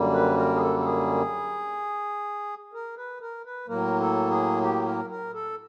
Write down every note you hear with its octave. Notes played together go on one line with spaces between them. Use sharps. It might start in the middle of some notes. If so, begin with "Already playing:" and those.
Already playing: F#2 D3 G3 A#3
B4
A#4
G#4
A4
A4
G#4
A#4
B4
A#4
B4
A2 F#3 A#3 A#4
A4
G#4
G4
A#4
A#4
A4